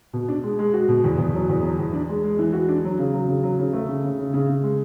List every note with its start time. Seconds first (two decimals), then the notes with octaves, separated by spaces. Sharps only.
0.13 B2
0.29 D4
0.43 G#3
0.59 G#3
0.74 F#4
0.88 B2
1.04 E2
1.18 E2
1.34 F#3
1.49 E2
1.63 F#3
1.79 E2
1.93 D4
2.09 G#3
2.24 G#3
2.39 E3
2.53 F#4
2.68 D4
2.84 F#3
2.99 C#3
3.13 F#3
3.28 C#3
3.43 F#3
3.59 C#3
3.73 A3
3.89 C#3
4.04 C#3
4.19 C#3
4.34 C#3
4.49 C#3
4.63 G#3